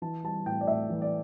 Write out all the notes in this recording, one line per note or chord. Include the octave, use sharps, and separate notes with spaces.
E3 A5
G3 A5
A2 G5
D5
A2 E5
E3
D5